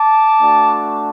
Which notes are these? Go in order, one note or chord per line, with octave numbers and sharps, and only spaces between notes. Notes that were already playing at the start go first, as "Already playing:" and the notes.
Already playing: A5 D6
A3 D4 F#4